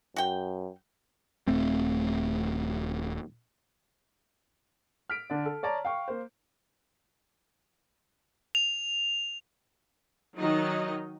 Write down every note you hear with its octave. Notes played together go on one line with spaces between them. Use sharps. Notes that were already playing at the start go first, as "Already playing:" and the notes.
F#2 F#4 G5
D#1 A3 C4
F6 B6 D7
D3 D5
A4
C#5 D5 A5 A#5
F5 G5 C#6
A#3 C5
F7
D#3 F#3 D#4 D#5